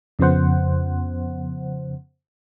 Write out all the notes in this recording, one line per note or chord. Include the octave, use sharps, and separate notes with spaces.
F2 C#3 F3 B3 C5 F#5